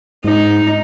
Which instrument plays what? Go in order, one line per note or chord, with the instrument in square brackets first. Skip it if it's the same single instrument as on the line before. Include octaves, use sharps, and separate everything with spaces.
[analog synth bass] G#2 [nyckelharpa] D#4